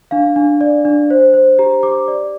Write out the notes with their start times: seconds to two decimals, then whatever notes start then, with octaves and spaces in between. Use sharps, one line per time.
0.11 D4 F5
0.36 D4
0.61 D5
0.85 D4
1.10 C5
1.34 C5
1.59 G4 A#5
1.83 G4 D6
2.08 D5